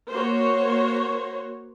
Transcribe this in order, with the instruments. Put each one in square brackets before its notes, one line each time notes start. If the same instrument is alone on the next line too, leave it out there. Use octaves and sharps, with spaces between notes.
[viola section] A#3 F#4 C5 C#5